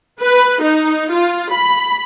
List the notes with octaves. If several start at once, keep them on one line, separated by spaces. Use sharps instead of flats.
B4
D#4
F4
B5